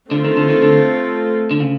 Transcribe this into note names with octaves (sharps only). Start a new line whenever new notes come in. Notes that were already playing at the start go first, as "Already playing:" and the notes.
D3 A3 C4 F4 A4
D#3
D3
D#3
D3
D3
C#3